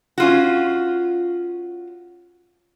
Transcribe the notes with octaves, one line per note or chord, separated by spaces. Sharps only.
C#4 F4 F#4